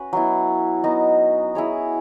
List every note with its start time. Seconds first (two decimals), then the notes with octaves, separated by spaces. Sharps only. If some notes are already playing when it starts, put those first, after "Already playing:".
Already playing: C#4 F#4 B4
0.13 F#3 B3 E4
0.84 B3 D#4 F#4
1.55 E4 G#4 C#5